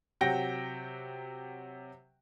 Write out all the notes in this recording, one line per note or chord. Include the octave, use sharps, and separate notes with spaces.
C3 F#3 F#5 G5 A#6